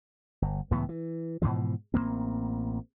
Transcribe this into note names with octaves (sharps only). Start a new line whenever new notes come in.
G1
C#2 A2 E3 B3
E3
G#2 B2 E3 F3
A1 F#3 A#3 C4